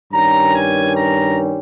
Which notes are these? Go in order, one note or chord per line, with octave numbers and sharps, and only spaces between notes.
G2 D#3 G3 C#4 A#5
G#5
A#5